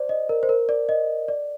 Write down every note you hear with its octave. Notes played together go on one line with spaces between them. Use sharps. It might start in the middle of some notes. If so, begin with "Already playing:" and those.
Already playing: C5 D5
D#5
A#4
C5
A#4
D5
D#5
D5